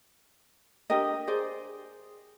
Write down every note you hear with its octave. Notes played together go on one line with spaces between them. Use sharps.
D4 G4 A#4 D#5
G#4 C5 D5